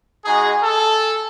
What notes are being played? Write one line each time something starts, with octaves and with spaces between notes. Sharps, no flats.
G#3 D#4 F#4 G#4
A4